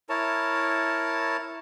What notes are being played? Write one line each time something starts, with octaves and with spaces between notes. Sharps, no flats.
E4 A#4 C#5 A5